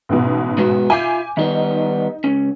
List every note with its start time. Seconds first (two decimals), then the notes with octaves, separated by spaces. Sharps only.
0.09 A1 G#2 B2
0.58 G#3 B3 F#4
0.90 F4 E5 F5 G#5 D6 G6
1.37 D#3 G3 B3 D#4
2.24 C#2 C#4